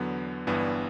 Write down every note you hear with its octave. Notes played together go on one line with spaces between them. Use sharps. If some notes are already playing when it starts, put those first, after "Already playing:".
Already playing: E2 D3 F#3 B3
G1 G2 E3 B3 D4